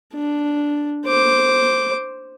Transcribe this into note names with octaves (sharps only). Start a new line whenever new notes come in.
D4
C5 D6